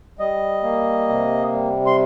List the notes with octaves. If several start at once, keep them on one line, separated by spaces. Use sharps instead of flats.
G3 D#5
A#3
C3
G3
C6